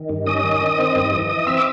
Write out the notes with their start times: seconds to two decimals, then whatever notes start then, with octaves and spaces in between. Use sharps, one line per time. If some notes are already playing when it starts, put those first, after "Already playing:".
Already playing: D#3
0.09 G2
0.26 C#4 D#5 D#6
0.44 D#3
0.61 D#3
0.79 C4
0.96 G2
1.12 E3
1.29 E3 D#5 D#6
1.47 C4 E5 E6
1.58 D6